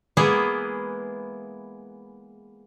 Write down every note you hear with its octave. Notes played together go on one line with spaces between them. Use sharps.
E3 G#3 A#3 B3 E4 G#4